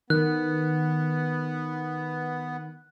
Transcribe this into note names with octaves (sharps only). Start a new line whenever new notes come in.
D#3 B3 F#6